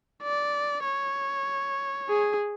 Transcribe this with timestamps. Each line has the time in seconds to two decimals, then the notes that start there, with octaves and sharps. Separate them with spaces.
0.23 D5
0.85 C#5
2.09 G#4